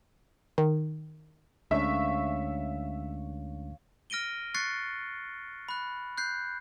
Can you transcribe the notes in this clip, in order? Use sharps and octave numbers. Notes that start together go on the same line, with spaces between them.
D#3
D2 G#3 C#4 D4 C#5 E5 F5
F6 A#6 D7 D#7 G7
C#6 F#6 A6 C7 C#7
B5 F#6
F#6 G6 C7